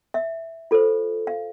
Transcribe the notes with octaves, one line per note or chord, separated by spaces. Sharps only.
E5
F4 A4 C5
F5